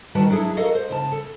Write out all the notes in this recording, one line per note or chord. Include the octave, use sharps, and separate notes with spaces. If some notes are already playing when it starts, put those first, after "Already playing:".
D3 D#3 G3 F#4 B4 A5
F#3 D4 E4 G#4 A4
F#4 A4 A#4 D#5 F5
C5
C#3 A5
A4